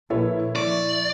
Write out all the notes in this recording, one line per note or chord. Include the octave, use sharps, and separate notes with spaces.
A#1 A#2 E4 A4 B4 C#5
F3 D5 C#6